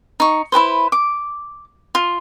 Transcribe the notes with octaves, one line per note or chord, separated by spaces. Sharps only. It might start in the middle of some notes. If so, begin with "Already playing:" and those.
D#4 C#6
E4 G4 B4 C5
D6
F4